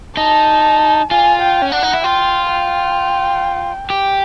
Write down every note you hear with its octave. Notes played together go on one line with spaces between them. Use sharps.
D#4 A5
F4 G#5
G5
C#4
D4 F#5
D#4
E4
F4 G5
G5
G4 G5